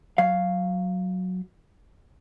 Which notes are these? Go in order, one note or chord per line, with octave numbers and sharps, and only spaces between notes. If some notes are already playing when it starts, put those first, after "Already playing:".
F#3 F5